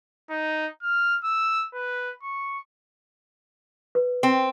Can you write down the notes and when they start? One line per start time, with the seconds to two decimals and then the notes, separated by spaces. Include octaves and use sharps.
0.30 D#4
0.82 F6
1.24 E6
1.74 B4
2.23 C#6
3.95 B4
4.23 C4